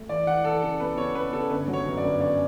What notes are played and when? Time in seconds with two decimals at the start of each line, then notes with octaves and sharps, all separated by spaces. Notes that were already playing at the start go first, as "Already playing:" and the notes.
Already playing: A3
0.09 E3 D5
0.27 E3 F#5
0.44 E3 A4
0.62 C#3 A4
0.80 B3 B4
0.98 C#3 C#5
1.15 B3 B4
1.33 C#3 A4
1.50 G1 B4
1.68 F#3
1.73 C#5
1.86 F#2
1.97 D5
2.04 G1
2.21 C#3 D5